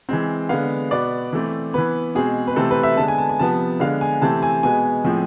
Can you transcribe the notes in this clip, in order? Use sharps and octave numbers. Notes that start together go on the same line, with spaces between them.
E3 G#3 C4
D3 G#3 B3 F5
B2 B3 D5
E3 A3 C4
E3 B3 B4
B2 G#3 C4 G#4
B4
C3 E3 A3 C4 A4
B4
E5
D3 G#3 B3 A5
G#5
A5
G#5
C3 F3 B3 A5
D3 G#3 B3 F5
G#5
C3 E3 A3 C4 A5
G#5
B2 G#3 B3 G#5
A2 F3 G#3 C4